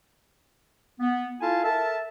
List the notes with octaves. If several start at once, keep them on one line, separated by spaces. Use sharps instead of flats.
B3
E4 F4 A4 F5 G#5 A5
A4 A#4 E5 A5